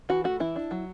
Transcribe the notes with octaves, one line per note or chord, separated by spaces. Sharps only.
E3 F#4
A3 F#4
E3 E4
D4
F#3